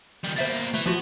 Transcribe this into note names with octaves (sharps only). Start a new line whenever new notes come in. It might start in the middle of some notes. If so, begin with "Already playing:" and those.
D#3 G3
B2 A#3 C5 E5 A6
E3 A3
F3 B3 F4 F#4